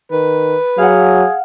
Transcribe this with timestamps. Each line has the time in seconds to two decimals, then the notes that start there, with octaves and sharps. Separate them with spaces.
0.12 D#3 B4
0.78 F#3 G#4 F5 F#5